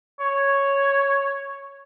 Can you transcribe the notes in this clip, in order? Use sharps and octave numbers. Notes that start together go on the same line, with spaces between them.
C#5